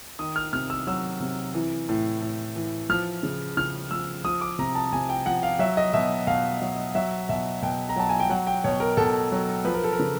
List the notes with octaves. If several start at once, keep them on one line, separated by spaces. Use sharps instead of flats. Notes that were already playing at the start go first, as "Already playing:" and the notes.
D#3 D#6
F6
C3 F6
E6
F#3 E6
C3
E3
A2
A2
E3
F3 F6
C#3
C#3 F6
F3 E6
F3 D#6
D6
C3 A#5
A5
C3 G#5
G5
F3 F#5
F5
F#3 E5
D#5
B2 E5
B2 F5
F#3
F#3 E5
B2 E5
B2 G5
A#5
F#3 A5
G#5
G5
F#3 F#5
G5
B2 C#5
A#4
B2 A4
F#3
F3 B4
A#4
A4
A#4
C#3